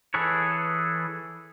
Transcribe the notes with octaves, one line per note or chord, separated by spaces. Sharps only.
E3 G#4 A4 B4 C#5